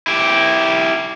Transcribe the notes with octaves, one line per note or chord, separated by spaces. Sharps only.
E4 G4